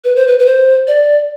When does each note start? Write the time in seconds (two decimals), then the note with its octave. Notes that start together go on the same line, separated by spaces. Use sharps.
0.04 B4
0.16 C5
0.28 B4
0.39 B4
0.46 C5
0.87 D5